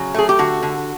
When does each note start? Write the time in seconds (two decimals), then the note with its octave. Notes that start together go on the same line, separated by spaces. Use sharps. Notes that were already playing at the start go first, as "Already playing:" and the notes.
Already playing: C#3 F#3
0.14 A3 G#4
0.29 G4
0.39 D3 F#4
0.63 D3